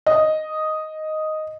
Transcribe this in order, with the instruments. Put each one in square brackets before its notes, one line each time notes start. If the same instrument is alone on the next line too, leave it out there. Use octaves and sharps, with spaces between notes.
[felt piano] D#5